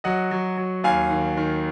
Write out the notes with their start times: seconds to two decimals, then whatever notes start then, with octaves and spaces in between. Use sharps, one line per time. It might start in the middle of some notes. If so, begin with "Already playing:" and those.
0.04 F#3 D#5 F#5
0.31 F#3
0.57 F#3
0.84 D#2 F5 G#5
1.10 D#3
1.37 D#3